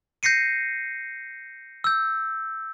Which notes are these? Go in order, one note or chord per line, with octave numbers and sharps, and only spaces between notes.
G6 A#6 C7 C#7 D#7
E6 G6